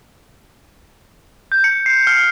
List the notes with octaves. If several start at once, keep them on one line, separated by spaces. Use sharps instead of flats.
G6
C#7
C7
F6